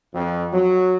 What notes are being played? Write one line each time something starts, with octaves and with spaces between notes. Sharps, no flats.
F2
F#3